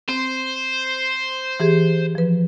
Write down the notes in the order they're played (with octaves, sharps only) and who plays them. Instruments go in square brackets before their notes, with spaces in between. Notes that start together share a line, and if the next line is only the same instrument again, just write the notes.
[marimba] C4 [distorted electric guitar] C5
[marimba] E3 G4 G#4
F3 B4